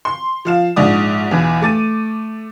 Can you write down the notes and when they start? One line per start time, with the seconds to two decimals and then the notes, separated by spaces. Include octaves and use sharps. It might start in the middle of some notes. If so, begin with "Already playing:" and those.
0.05 C6
0.45 F3 F5 E7
0.76 A#1 G#2 D5 D#6
1.31 B1 E2 E3
1.62 A3 D6 A6 D#7